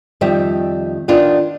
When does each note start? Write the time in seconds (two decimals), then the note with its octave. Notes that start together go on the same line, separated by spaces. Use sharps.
0.21 F2 D#3 G3 E5
1.08 D#3 B3 D4 F4